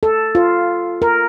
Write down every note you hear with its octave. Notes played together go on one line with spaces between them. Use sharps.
A4
F4
A#4